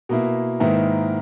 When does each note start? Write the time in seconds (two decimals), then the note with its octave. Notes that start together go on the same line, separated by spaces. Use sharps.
0.09 B2 A#3 E4
0.60 G#2 D#3 A#3 E4 B4